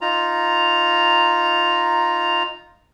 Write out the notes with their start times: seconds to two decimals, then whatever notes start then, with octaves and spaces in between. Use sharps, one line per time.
0.01 D#4 F4 A#5